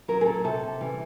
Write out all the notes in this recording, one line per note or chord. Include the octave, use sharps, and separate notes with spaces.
F#3 A#4
G#4
A4
C3 A4
E3 G3